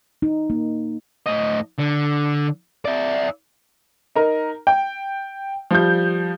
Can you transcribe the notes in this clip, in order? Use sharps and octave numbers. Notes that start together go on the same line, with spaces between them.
D#4
A#3
A2 D#5
D3
E4 D5
D#4 A#4
G5
F3 G3 G6